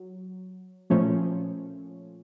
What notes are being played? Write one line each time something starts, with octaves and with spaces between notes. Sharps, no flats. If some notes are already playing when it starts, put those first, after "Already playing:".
Already playing: F#3
A#2 F3 A3 C#4